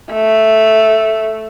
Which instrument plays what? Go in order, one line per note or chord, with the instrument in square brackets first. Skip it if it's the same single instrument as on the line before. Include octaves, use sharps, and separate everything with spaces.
[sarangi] A3